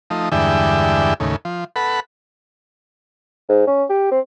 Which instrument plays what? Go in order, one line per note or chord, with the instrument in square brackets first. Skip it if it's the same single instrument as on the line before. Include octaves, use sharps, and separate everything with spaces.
[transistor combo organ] F3 A3 D#4
E2 G2 D3 G#3 E5 G5
D#2 A2 C#3
F3
A4 B4 F#5 B5
[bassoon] G#2
C#4
G4
C4